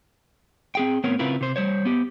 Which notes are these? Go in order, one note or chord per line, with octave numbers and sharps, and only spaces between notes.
C4 G#4 G5
A2 B3 C4 A#4 C#5
C#3 C4 E4 F4 A#4 B4
C3 C5
G3 C5 C#5
B3 G4